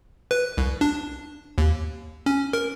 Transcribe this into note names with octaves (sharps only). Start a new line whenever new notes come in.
B4
C2
D4
D#2
C#4
A#4